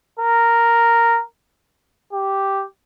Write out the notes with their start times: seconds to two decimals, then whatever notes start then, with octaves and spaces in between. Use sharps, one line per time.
0.19 A#4
2.13 G4